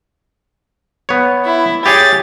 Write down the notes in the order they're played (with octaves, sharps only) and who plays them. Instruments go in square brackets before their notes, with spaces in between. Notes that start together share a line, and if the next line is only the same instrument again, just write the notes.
[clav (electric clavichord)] B3 C#5
[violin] E4
[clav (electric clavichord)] G4 G#4 C#5 [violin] A6